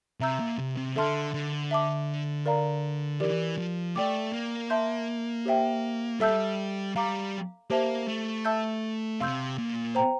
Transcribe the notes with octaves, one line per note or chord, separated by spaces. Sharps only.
C3 E5 A#5 E6 G6
A#2
C3
C3
D3 A4 E5 A5 C6 F6
D3
E5 A5 D6
A#4 D5 F5 A#5
E3 G4 A#4 D5
F3
A3 D5 G5 D6
A#3
E5 A5 C6 G6
G4 C5 E5 G5
G3 A4 E5 A5 E6 G6
G3 F5 A#5 D6
A#3 G4 C5 E5 A5
A3
E5 A5 E6 G6
C3 F5 C6 E6 G6
A#2
C5 G5 A#5